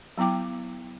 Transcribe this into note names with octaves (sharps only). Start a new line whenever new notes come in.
F#3 B3 E4 G5 D6